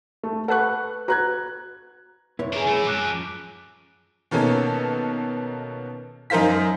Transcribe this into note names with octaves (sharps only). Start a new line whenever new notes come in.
A3
A4 B4 F#5 C#6 F#6
F#4 B4 A#5 F#6 G#6
F2 C3 C4 E4 B4 C#5
C#4 D4 G#4 A#4
F3 G#3 A3 E4
F#2 F3 D6 F#6 D7
B2 D#3 A#3 C#4 A4
F#2 D#4 A#4 C5 F5 B6